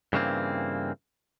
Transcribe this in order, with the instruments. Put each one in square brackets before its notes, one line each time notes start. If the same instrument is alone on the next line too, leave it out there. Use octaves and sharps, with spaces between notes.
[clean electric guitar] G2 C#3 E3 A#3 C4